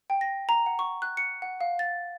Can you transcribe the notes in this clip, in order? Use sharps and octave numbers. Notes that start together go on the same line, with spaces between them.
G5
A#6
A#5
F#5
C#6
F#6
C#7
F#5
F5
A6